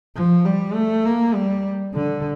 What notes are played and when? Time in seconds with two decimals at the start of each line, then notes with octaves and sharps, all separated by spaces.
0.16 F3
0.45 G3
0.74 A3
1.05 A#3
1.34 G3
1.94 D3